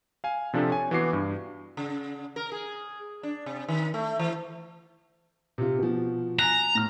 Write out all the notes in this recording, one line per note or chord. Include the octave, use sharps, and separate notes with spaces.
F5 G#5
C3 F3 D4 F4 A4
C#5 G#5
E3 B3 F#4 D6 C7
G2
C#3
A#4
G#4
D4
C3
D#3
A3
E3
C3 F4
B2 F3
G#5 A#5 F#6
A2 F6